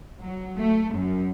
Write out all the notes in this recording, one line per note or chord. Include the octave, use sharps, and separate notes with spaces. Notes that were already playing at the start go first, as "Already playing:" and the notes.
F#3
A3
F#2